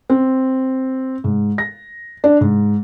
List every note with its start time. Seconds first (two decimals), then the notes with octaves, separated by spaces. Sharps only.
0.10 C4
1.24 G#2
1.58 A#6
2.24 D4
2.41 G#2